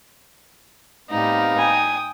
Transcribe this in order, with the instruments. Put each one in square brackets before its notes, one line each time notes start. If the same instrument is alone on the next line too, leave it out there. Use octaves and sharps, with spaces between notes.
[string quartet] A2 G3 G4 [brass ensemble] B3 C4 F5 [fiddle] D#4
[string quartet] G5 D#6 [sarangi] G#5